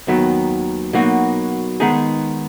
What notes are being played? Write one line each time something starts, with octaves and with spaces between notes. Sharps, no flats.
D#2 D#3 F#3 B3
B2 F#3 A#3 D#4 F#4
D#3 G#3 B3 D#4 G#4